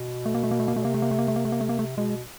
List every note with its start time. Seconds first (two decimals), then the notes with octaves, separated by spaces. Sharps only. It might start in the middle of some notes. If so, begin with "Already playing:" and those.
Already playing: B2
0.26 A3
0.35 A#3
0.43 A3
0.51 A#3
0.60 A3
0.68 A#3
0.75 B2 A3
0.83 C3 A#3
0.94 A3
1.02 A#3
1.11 A3
1.19 A#3
1.28 A3
1.36 A#3
1.45 A3
1.52 A#3
1.61 A3
1.69 A#3
1.79 A3
1.97 B2 G#3